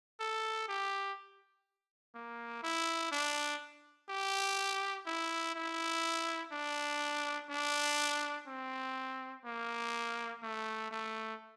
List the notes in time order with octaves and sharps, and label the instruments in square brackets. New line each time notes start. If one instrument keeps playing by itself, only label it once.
[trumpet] A4
G4
A#3
E4
D4
G4
E4
E4
D4
D4
C4
A#3
A3
A3